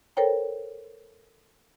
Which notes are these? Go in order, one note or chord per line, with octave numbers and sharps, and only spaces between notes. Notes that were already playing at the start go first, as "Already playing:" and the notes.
A4 A#4 C5 C#5 G5 A#5